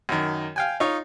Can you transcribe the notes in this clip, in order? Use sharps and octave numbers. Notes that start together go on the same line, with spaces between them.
F#2 D#3
F5 G5 G#5
D#4 F4 C#5